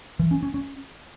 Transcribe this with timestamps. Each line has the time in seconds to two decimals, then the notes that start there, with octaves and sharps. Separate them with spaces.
0.19 E3
0.31 C#4
0.43 C#4
0.54 C#4